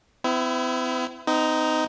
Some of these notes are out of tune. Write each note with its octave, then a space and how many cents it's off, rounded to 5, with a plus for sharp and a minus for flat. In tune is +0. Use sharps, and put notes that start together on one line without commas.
C4 -45 E4 +15
C4 -45 D#4 +0